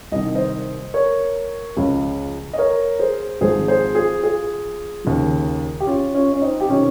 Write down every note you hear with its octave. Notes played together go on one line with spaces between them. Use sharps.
C2 C3 D#3 D#5
C5 D#5
A#4 C#5
C#2 C#3 F3
D#5
A#4 C#5
G#4 C5
G#1 G#2 F3 G#4 C5
G#4 C5
F4 G#4
F4 G#4
D#2 C#3 F3
G4
C#4 F4
C#4 F4
C#4
C4 D#4
G4
C3 D#3 C#4 F4